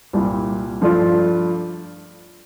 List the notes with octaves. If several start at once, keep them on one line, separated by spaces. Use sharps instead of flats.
C2 A#2 G3
G2 F3 A3 D4 F4